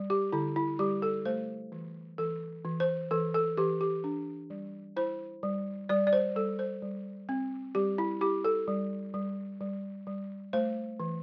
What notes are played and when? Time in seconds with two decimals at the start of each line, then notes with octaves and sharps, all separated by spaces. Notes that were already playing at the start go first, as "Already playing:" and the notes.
Already playing: G3
0.10 G4
0.33 D3 E4
0.56 E4
0.79 G3 G4
1.02 A4
1.25 A3 C5
1.72 E3
2.18 E3 A4
2.65 E3
2.80 C5
3.11 E3 A4
3.34 A4
3.57 E3 G4
3.81 G4
4.04 D4
4.50 G3
4.97 E4 C5
5.43 G3
5.89 G3 D5
6.07 D5
6.13 C5
6.36 G3 A4
6.59 C5
6.82 G3
7.29 C4
7.75 G3 G4
7.98 E4
8.21 E4 G4
8.45 A4
8.68 G3
9.14 G3
9.61 G3
10.07 G3
10.53 A3 C5
11.00 E3